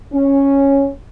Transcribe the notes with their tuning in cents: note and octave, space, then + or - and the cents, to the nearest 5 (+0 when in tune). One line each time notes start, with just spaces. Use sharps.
C#4 -5